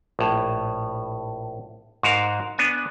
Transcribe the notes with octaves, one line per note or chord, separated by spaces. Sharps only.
A#1 A2
G#2 F#4 A#4 F5
B3 D4 G#5